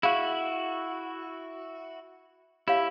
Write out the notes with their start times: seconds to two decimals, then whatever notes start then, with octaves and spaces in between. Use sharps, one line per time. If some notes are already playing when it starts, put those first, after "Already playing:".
0.03 E4 F#4 G#4 F5
2.68 E4 G4 C#5 F5